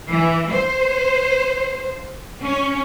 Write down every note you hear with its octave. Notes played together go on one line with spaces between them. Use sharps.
E3
C5
C#4